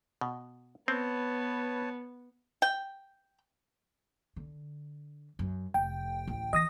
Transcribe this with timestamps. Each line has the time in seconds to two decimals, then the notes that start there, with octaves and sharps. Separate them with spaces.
0.21 B2
0.88 B3 C4 B4 C#5 A5
2.62 G5
4.36 D3
5.39 F#2
5.74 F1 G5
6.27 A1 D2
6.53 E3 D#5 D#6 A#6